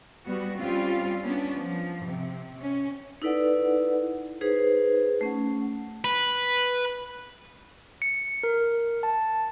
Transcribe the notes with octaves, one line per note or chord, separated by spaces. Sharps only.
G3 B3 F#4
G3 C4 C#4 F4
B3 C#4 D4
F3
C3
C#4
D#4 E4 A4 B4 D5 F#5
D#4 G#4 B4 C5
A3 C#4 F#5
B4
C#7
A#4
A5